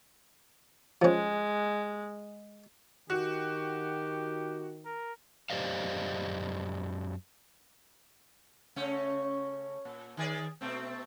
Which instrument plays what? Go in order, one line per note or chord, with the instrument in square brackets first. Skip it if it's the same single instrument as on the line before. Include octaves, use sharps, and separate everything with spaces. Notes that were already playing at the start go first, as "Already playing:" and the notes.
[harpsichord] F3 C#4 [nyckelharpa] G#3
[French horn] D#3 [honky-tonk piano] F#4 [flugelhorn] G4
[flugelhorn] A#4
[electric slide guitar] F#2 G4 C5 D5 D#5 F5
[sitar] C#3 A3 C#4
A#2
D#3 G#4 D5
B2 A3 C4